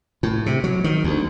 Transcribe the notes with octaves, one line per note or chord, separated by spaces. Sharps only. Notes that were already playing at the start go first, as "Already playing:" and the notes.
A2
C3
F#3
D#3
D2